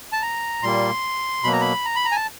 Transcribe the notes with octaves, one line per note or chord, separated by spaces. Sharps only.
A5
A#5
A#2 G3 A#3 C6
B2 F#3 A#3 B5
A#5
B5
A#5
B5
A#5
G#5
A5